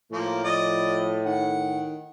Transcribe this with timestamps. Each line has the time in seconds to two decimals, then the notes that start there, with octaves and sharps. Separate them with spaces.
0.12 A2 F3 A#3
0.44 F3 D5 D#5
1.26 D#3 F#5